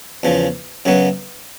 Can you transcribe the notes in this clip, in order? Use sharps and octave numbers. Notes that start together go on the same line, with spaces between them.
E2 C#3 F3
F#2 C#3 F#3 B3